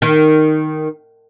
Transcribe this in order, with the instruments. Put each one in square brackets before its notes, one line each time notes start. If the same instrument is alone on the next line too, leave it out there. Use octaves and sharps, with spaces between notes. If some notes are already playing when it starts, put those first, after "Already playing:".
[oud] D#3